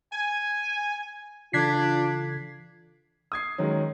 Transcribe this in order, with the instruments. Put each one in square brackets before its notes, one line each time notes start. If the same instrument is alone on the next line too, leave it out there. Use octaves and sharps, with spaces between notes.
[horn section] G#5
[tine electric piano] C#3 E3 A4 [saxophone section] D4 [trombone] F4 [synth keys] G#6 B6 C7
[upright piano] D#6 G#6 C7
D#3 F#3 G#3 C#4